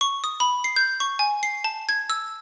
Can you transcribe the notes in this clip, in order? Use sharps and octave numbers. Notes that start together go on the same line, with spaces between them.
C#6
D#6
B5
C7
G6
C#6
G#5
C7
A5
G#6
E6